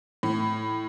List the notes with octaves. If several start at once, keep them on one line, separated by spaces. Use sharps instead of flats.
A2